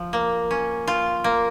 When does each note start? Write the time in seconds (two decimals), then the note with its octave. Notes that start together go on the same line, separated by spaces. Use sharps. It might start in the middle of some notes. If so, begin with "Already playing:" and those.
Already playing: F3
0.13 A#3
0.51 C#4
0.88 F4
1.24 A#3